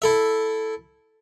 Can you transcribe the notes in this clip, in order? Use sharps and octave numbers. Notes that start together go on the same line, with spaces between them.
E4 A4 E5